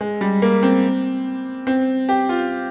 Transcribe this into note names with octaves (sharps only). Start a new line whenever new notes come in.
G#3
G3
A#3
C4
C4
G4
F4